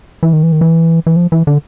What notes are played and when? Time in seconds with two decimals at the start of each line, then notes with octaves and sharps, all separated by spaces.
0.23 E3
0.33 D#3
0.43 E3
0.52 D#3
0.61 E3
1.07 E3
1.16 F3
1.32 E3
1.47 D3